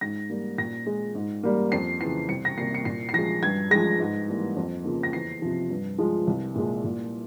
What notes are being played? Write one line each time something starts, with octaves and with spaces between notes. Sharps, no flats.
G#2 A#6
G3 A#3
A#2 A#6
G#3
G#2
G3 A#3
F2 C7
C#3 E3 C7
C2 C#7
A#6
C3 G3 A#3 C7
C#7
A#2 C7
C7
F3 G#3 A#6
G2 G#6
F3 G#3 A#6
G#2
E3 G3 A#3
F2
C#3 F3 A#3
A#6
E2 C7
C3 F3
G2
F3 G#3
C2
A#2 G#3
A#2